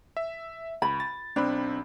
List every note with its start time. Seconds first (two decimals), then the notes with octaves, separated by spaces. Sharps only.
0.17 E5
0.82 C#2 B5
1.00 A6
1.36 B1 C4 D4 B5